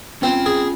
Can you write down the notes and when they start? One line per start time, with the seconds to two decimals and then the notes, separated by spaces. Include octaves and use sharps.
0.22 C4 C#4 F4
0.46 G#4